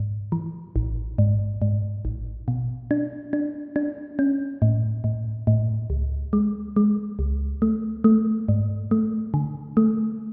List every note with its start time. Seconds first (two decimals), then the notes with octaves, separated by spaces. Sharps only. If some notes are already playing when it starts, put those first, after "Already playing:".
Already playing: G#2
0.32 E3
0.76 A1
1.18 G#2
1.62 G#2
2.05 A1
2.48 B2
2.91 D4
3.33 D4
3.76 D4
4.19 C#4
4.62 A2
5.04 A2
5.47 A2
5.90 C#2
6.33 G#3
6.76 G#3
7.19 C#2
7.62 A3
8.04 A3
8.49 G#2
8.91 A3
9.34 D3
9.77 A3